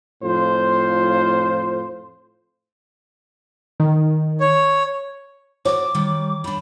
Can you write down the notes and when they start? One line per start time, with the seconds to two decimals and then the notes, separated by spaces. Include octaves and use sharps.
0.23 F2 A2 F4 C5
3.80 D#3
4.40 C#5
5.65 F#4 C#5 D5 D6
5.95 D#3 G3
6.44 G3 D4 B5